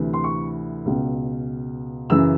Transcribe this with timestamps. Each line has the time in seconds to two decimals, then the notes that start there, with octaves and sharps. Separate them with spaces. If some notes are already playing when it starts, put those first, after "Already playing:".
Already playing: D2 C3 E3
0.14 C6
0.24 C#6
0.86 C#2 B2
2.10 F#2 C#3 E3 E6